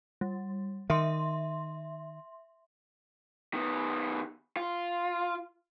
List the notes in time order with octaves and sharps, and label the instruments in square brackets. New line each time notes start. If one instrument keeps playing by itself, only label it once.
[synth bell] G3
[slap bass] D#3 [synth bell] E5 C6
[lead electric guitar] D#3 B3
F4